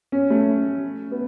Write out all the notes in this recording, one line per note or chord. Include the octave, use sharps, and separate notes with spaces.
C#4
A3
B3